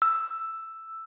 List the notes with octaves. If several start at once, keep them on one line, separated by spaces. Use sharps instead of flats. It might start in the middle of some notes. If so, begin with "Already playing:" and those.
E6